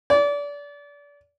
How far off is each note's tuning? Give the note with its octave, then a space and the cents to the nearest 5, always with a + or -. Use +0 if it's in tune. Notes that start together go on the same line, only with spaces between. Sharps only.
D5 -30